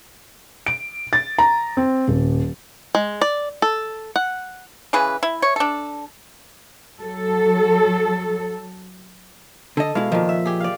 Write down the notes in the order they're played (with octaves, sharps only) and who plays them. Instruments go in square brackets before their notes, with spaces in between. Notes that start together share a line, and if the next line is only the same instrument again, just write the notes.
[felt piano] D7
A6
A#5
C4
D#1
[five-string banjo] G#3
D5
A4
F#5
[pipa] C#3 E3 G#4 B4
E4
C#5
D4 A4
[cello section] F#3 A4
[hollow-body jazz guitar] D3 D#5 [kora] A4
[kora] B2 F5 [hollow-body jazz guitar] G#3 E4
[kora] A#2 D#3 [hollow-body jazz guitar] F3
[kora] E5
G4 G#4
D5 F5